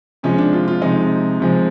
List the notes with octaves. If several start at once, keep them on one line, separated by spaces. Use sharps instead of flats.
C3 F3 G#3 C#4
D4
F4
F4
C3 F3 G#3 D#4
C3 F3 G#3